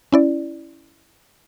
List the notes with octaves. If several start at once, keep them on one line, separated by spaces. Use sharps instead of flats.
C#4 E4 D5